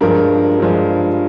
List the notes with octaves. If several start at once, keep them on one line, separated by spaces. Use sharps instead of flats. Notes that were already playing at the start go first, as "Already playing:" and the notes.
G2 F3 G#3 A#4
G2 F3 G#3